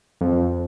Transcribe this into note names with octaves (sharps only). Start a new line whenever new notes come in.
F2